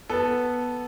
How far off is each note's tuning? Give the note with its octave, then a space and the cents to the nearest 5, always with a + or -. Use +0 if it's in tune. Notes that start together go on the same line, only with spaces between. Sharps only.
B3 -5 A4 +0